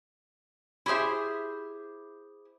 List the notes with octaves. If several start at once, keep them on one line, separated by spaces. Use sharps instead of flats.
E4 G4 G#4 C5 E5